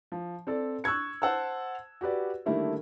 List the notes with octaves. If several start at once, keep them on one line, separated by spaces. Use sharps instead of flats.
F3
C4 A4 D5
C#6 E6 F#6 G#6 C#7
C5 F#5 A5 E6
F#4 G4 B4 D5
D3 D#3 G3 A3 A#3 E4